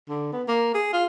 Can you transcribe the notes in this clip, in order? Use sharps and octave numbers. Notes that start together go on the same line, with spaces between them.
D3
B3
A#3
G#4
F4